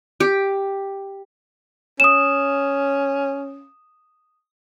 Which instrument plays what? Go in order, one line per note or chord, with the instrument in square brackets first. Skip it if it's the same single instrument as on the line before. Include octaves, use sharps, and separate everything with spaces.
[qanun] G4
[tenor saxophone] C#4 [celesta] D#6 E7